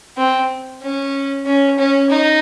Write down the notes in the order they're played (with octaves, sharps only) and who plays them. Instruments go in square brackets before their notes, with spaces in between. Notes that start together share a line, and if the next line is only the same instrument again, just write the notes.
[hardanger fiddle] C4
C#4
C#4
C#4
D#4